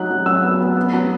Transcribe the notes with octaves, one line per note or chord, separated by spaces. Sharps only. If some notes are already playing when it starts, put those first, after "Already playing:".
Already playing: F#3 D#4 F#6
F#3
F#3 E6
B3
B3
B3
F#3